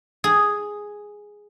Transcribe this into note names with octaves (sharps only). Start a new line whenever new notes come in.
G#4